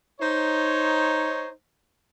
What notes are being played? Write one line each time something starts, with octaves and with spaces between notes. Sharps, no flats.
D#4 C5 C#5